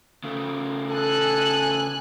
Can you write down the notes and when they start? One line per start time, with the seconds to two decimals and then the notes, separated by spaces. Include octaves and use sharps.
0.24 C#3 A3
0.90 A4 G#5 F#6